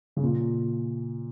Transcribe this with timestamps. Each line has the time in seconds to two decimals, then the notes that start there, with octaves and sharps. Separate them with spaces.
0.16 C#3
0.23 A#2